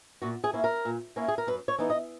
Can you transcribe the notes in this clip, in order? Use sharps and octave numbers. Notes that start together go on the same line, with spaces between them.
A#2 F#4
G#4
A#3 C#4 E4
A#4
A#2
A#3 C#4 E4
G#4
A#4
F#2 B4
C#5
E3 B3 D#4
D#5